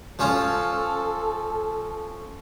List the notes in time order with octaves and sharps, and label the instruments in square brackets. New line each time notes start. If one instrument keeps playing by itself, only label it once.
[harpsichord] F3 C#4 F4 [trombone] A4